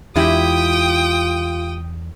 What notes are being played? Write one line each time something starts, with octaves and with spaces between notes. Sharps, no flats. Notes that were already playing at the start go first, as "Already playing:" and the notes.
E2 G#3 E4 F4 G4 G5 D#6